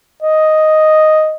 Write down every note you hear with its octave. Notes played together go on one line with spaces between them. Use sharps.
D#5